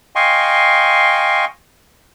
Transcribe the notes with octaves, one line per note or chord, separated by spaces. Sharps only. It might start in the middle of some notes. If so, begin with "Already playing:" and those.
D#5 F5 G5 G#5 C6 C#6